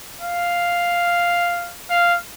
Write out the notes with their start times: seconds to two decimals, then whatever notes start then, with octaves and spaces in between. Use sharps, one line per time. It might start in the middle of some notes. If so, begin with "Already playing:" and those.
0.21 F5
1.90 F5